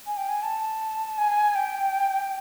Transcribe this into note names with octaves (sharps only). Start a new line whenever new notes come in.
G#5
G5
G#5
A5
G#5
G5